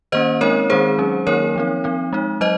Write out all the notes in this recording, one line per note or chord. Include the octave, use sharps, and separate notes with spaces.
D#3 A#3 C#4 C5 D#5
G#3 C4 D#4 A#4 C#5
D#3 G#3 C4 D#4 G#4 C5
F#3 C#4
D#3 F#3 A#3 D#4 A#4 C#5
F3 C4 D#4
F3 C4 D#4
G#3 D#4
F#3 C5 D#5